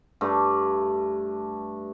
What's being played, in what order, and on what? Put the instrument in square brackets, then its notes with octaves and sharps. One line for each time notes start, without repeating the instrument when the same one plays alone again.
[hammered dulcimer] G2 A3